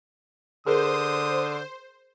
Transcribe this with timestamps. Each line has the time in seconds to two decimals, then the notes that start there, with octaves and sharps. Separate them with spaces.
0.67 D3 G#4 A#4 C5 D#6